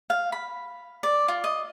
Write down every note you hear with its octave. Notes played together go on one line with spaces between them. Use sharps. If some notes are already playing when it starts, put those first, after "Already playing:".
F5
B5
D5
F4
D#5